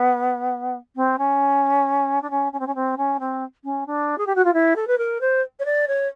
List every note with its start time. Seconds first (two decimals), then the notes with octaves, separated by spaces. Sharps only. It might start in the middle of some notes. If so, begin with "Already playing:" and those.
Already playing: B3
0.95 C4
1.18 C#4
2.22 D4
2.30 C#4
2.52 C#4
2.59 C4
2.66 C#4
2.75 C4
2.97 C#4
3.19 C4
3.64 C#4
3.86 D4
4.18 G#4
4.26 G4
4.35 F#4
4.44 F4
4.53 E4
4.76 A4
4.87 B4
4.98 A#4
5.20 C5
5.59 C#5
5.65 D5
5.87 C#5